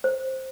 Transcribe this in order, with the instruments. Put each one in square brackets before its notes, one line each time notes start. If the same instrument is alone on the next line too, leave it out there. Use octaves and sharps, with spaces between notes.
[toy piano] C5